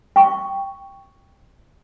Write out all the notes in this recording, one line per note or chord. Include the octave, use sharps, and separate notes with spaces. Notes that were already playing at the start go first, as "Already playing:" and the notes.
G5 C#6